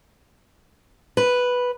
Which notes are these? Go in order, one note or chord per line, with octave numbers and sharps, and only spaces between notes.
B4